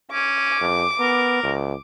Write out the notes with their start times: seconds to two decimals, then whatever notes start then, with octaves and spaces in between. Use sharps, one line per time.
0.12 C#4 D6
0.61 F2
1.00 B3 A#4
1.43 C#2